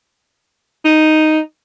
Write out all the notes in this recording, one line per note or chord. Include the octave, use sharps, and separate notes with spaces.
D#4